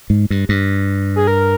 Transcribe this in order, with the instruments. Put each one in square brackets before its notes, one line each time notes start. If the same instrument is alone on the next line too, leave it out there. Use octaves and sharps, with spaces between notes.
[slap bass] G#2
G2
G2
[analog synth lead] G#4
A#4